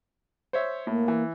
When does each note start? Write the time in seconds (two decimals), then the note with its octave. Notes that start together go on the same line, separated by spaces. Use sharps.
0.53 C5 C#5 E5
0.87 A2 A#3
1.08 E3